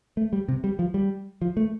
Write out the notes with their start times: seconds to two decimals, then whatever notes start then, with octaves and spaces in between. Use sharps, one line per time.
0.17 A3
0.33 G3
0.48 C3
0.64 G3
0.79 F3
0.94 G3
1.42 F3
1.57 A3